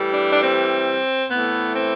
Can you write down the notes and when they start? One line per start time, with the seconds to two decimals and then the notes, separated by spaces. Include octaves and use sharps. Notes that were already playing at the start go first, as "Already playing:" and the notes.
Already playing: A2 E3 G3
0.13 D4
0.32 D4
0.43 C4
1.31 A2 E3 A3 B3
1.75 C4